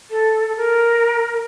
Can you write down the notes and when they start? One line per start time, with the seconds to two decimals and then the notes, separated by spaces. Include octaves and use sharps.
0.10 A4
0.56 A#4